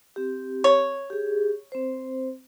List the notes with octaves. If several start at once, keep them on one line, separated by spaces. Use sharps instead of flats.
C4 G4
C#5
G4 G#4
C4 C5